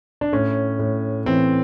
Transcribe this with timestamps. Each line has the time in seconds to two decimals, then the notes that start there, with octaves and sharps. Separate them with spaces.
0.21 D4
0.32 A2 C#4
0.79 A2
1.26 E3 C4